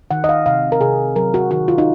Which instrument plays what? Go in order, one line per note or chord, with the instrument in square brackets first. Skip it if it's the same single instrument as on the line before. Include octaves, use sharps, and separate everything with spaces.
[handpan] D#3 F#5
D#5
F5
C3 F5
A#4
C3 G#4
F#3 A#4
F#4
D#3 F#4
F4
D#4